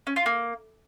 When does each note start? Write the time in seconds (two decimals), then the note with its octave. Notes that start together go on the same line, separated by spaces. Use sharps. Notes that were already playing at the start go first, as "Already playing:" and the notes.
0.07 C#4
0.16 F4
0.26 A#3